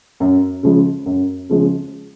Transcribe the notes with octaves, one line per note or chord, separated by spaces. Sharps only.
F#2
C#3 F3 G#3
F#2
C#3 F3 G#3